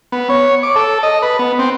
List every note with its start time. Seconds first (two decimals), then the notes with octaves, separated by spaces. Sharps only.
0.12 B3
0.29 C#5
0.63 D6
0.76 A4
1.03 D#5
1.22 B4
1.39 B3
1.59 C4